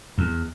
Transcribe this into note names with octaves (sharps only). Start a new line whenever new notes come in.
E2